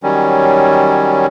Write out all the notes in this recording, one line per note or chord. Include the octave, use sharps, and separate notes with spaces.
D#3 F#3 G3 C#4